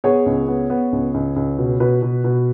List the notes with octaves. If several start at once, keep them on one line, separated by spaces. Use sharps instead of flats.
B3 G#4 C#5
C#2
B3
B3
C#2
C#2
C#2
B2
B2 B4
B2
B2